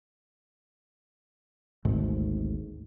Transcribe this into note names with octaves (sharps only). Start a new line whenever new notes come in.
G#1 D2 G#2